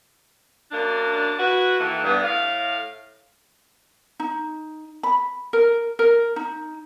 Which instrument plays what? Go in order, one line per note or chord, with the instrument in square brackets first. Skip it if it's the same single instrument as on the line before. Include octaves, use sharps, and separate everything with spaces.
[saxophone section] F#2 A#3 D4
E4 F#4 B4
D#3 E3 A#3 A4
G2 B3
A2 F5
[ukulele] D#4
B5
A#4
A#4
D#4